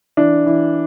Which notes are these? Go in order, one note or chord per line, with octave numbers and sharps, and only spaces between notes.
E3 D4
E3